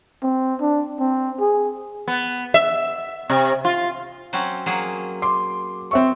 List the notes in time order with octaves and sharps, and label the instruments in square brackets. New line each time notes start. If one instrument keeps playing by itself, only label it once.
[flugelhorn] C4
D4
C4
G#4
[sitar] B3
E5
C3
F4
[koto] F#3 C4 C#4
F#3 A#3 G#4
[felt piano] C6 D6
C4 E5 C#6